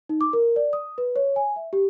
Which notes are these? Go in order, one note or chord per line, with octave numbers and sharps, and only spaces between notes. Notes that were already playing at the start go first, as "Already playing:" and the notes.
D#4
D6
A#4
D5
D#6
B4
C#5
G#5
E5
G4